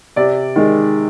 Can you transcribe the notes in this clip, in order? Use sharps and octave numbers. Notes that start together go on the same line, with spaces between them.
C3 D5
D#3 G#3